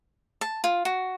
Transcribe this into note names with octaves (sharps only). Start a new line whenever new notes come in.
A5
F4
F#4